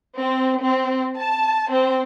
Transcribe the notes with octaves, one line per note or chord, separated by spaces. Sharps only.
C4
C4
A5
C4